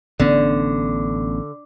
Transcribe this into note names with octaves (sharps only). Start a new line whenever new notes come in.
A1 D3 B3 C#4